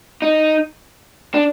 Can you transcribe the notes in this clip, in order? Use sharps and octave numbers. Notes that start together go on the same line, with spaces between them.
D#4
D4